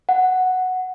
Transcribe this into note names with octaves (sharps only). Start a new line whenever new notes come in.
F#5